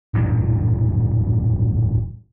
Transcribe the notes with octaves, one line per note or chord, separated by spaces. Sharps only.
D1 E2 G2 A#2